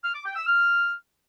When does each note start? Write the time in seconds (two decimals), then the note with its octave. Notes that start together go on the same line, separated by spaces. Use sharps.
0.03 F6
0.14 D6
0.25 G5
0.35 E6
0.46 F6